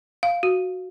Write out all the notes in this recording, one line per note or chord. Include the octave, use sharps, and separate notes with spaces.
F5
F#4